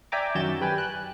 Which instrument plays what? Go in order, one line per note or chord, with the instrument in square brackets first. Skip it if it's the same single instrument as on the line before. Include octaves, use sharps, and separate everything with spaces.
[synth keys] D5 E5 G5 G#5 A#5 D6
F#2 D#3 F#4 G6 A6 E7
G4 B4 G5 G#5
F#6